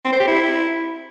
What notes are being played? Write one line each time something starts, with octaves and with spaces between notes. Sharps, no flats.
C4
C5
G4
E4